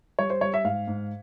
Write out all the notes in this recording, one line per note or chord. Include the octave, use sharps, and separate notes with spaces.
G3 C#5
C5
G3 C#5
E5
G#2 F5
G#2